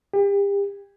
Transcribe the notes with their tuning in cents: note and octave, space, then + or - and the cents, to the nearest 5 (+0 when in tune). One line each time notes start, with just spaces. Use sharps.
G4 +35